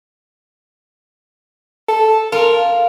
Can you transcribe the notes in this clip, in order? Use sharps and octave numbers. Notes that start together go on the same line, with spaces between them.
A4
F4 A#4